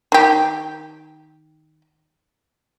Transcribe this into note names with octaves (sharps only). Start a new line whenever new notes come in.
D#3 G4